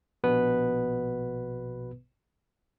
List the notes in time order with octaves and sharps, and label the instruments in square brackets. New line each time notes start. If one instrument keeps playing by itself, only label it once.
[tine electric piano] A#1 B2 B3 B4